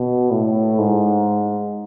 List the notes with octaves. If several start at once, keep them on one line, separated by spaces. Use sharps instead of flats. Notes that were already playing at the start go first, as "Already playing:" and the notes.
Already playing: B2
A2
G#2